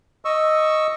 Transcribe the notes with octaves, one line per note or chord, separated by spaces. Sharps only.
D#5 C#6 E6